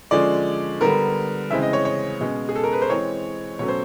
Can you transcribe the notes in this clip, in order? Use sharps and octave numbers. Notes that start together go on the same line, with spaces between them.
D3 F3 G#3 C#4 D5
D3 G3 B3 A#4
C#3 E3 G#3 C4 E5
D#5
C#5
C#5
B2 G#3 C#4
G#4
A4
A#4
B4
C5
E3 G#3 C4 C#5
B2 F#3 A3 C#4 C#5
C5